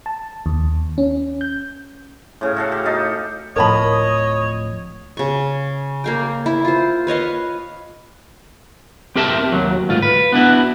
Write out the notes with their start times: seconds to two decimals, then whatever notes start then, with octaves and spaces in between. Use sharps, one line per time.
0.06 A5
0.46 D#2
0.98 C#4
1.41 G6
2.41 A2 C#3
2.57 F#4 A4 F5
2.72 G4
2.85 D#4 A4 D#5
3.56 D1 A2 F3 A#4 C#5 D#5 A5 B5
5.17 C#3 C#6
6.04 A#3 F5 G5
6.46 E4
6.65 F4 C5
7.07 B4 C#5 D#5 F5
9.16 C4 G4 A#4 E5 A5
9.52 D#2 F#3
9.89 D2 G#2 F4
10.02 B4
10.32 B3 D4 E4 F#4